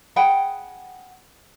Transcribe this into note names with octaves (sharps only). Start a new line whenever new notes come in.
G#4 F#5 G5 B5